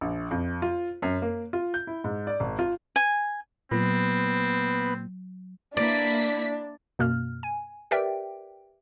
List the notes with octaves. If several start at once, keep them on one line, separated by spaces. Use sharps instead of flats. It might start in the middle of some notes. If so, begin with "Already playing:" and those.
A#1
F2
F4
F#2
A#3
F4
G6
E4
G#2
D5
G#1
F4
G#5
A#2 F#3 B3 C4
A#3 D4 E4 D5 B6
F#2 B2 A#3 F6
G#5
G4 A#4 B4 D5 E5 G5